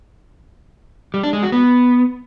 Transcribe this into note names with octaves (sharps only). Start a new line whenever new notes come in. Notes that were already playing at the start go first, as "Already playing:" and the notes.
G3
D4
G#3
F#4
B3